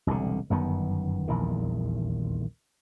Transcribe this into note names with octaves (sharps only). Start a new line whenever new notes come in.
E1 C2 A2 D3
G1 F#2 D#3 B3
D#1 A#1 E2 D#3